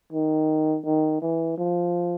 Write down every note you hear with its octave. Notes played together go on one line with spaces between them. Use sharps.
D#3
D#3
E3
F3